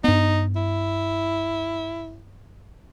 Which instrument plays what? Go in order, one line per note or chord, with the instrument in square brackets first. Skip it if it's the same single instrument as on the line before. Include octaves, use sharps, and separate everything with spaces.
[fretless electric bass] G2 B3 [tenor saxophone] D#4
[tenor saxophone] E4